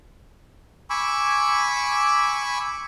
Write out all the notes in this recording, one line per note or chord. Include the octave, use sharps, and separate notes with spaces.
G#5 B5 C#6 D6 E6